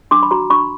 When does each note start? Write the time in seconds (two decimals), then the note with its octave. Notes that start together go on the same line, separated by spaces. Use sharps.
0.11 D4 C6 D6
0.23 B5
0.31 F#4 A#5 C6
0.50 D4 B5 C#6